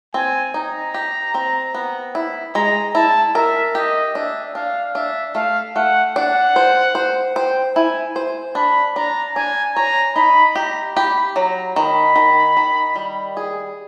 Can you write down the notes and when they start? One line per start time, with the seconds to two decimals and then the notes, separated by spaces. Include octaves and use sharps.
0.14 C4 G#5
0.54 D#4 A#5
0.94 G4
1.34 C4
1.74 B3
2.15 E4
2.55 G#3 A#5
2.95 E4 A5
3.35 A#4 E5
3.75 G4 D#5
4.15 D4 E5
4.55 D4 F5
4.95 D4 E5
5.35 A3 F5
5.76 A3 F#5
6.16 D4 F#5
6.56 C5
6.95 C5
7.36 C5 G5
7.76 E4 G#5
8.16 C5
8.55 D4 B5
8.95 D4 A#5
9.36 D4 G#5
9.76 C#5 A#5
10.16 D#4 B5
10.56 G4 A#5
10.96 G4 B5
11.36 F#3 A#5
11.76 D#3 B5
12.16 D#3
12.57 D#3
12.96 G3
13.37 G#4